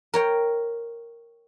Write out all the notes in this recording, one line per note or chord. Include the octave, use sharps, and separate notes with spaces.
A#4 C#5 G5